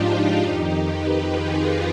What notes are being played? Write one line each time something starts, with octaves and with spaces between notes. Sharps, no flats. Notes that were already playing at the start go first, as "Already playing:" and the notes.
Already playing: G#2 F3 D4 D#4 F4 G4
F2 D#3 D#4 G4
G4 B4
F4 G#4